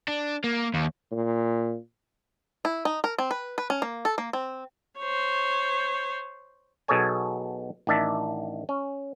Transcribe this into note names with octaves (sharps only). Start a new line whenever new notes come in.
D4
A#3
D#2
A#2
E4
D#4
A#4
C4
B4
B4
C#4
A#3
A4
A#3
C4
C5 C#5
B1 B2 G#4 A4 C#5 G#5
A1 D#3 D4 E5 A5
C#4